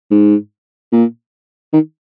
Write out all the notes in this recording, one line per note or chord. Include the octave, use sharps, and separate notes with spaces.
G#2
A#2
D#3